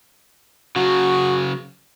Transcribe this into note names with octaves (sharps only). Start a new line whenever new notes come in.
C#3 F#3 F#4